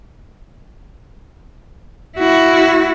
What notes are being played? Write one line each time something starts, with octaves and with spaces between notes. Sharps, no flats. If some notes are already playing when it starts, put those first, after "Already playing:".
E4 F#4